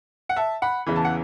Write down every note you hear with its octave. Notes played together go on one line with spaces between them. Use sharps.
F#5
E5 A5
F#5 B5
E2 C#3 E3 B5
A5
F#5